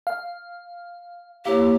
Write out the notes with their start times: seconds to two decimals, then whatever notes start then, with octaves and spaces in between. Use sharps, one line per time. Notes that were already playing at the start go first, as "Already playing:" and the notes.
0.07 F5
1.45 A#3 E4 G4 C#5 F5 D6